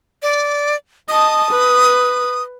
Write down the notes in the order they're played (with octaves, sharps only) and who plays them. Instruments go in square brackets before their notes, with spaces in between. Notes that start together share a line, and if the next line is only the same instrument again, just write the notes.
[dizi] D5
[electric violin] D#5 A5 [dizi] D#6
[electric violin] B4